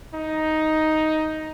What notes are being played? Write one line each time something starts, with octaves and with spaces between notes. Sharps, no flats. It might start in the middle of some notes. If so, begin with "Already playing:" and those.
D#4